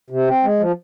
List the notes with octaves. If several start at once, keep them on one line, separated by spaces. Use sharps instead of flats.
C3
C4
G#3
F3